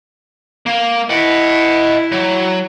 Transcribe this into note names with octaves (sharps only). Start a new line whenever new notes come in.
A#3
E4 D#5 F#5
F#3